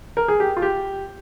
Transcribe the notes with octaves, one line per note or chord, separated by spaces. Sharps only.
A#4
G#4
G4
F4
G4